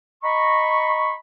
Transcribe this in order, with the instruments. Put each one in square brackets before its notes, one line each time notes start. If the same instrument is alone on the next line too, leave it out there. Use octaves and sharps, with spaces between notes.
[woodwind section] D#5 A#5 B5 C#6